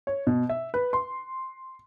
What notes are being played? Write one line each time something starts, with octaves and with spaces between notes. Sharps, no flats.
C#5
B2
E5
B4
C6